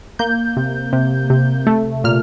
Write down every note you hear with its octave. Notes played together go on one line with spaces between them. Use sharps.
A#3 G6
C3
C3
C3
A3
A#2 F6